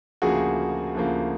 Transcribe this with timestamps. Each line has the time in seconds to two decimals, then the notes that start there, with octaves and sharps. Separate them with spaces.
0.22 D2 C#3 F3 A#3 F#4 G#4
0.95 D2 C#3 F3 A#3